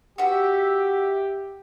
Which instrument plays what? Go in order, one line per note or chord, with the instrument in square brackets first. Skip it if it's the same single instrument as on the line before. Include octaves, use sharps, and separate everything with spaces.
[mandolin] F#4 E5 [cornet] G4